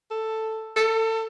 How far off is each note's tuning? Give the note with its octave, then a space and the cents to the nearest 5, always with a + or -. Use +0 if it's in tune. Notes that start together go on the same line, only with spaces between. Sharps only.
A4 +5
A4 +25